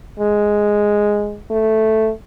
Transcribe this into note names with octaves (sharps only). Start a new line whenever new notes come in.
G#3
A3